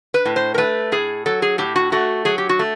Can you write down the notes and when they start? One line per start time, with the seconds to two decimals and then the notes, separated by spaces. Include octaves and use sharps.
0.14 B4
0.25 A2
0.36 C5
0.54 A#4
0.58 A3 B4
0.92 A2 G#4
1.26 F#3 A4
1.42 G#4
1.58 A2 G4
1.76 F#4
1.92 A3 F#4
2.25 F#3 G#4
2.38 G4
2.49 F#4
2.59 A3